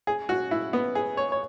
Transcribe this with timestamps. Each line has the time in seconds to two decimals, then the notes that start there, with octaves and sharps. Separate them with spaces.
0.07 G#4
0.29 F#4
0.51 E4
0.73 B3
0.95 G#4
1.17 C#5
1.32 C#5